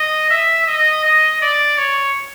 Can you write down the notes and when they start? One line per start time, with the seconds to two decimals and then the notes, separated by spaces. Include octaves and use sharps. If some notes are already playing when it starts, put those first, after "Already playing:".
Already playing: D#5
0.30 E5
0.67 D#5
1.04 D#5
1.42 D5
1.78 C#5